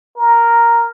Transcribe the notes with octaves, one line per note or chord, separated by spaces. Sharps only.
A#4